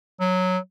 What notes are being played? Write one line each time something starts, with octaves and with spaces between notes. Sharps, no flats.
F#3